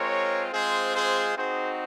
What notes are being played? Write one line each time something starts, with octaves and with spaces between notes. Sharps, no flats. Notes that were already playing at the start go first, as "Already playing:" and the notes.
Already playing: G#3 C4 F4 A#4 C#5
G#3 C4 F4 G#4 C5
G#4 C5
C4 D#4 F#4 G#4 C5